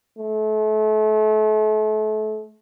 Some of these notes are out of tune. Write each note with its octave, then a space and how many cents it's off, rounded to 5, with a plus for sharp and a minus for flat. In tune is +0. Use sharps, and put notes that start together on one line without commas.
A3 -35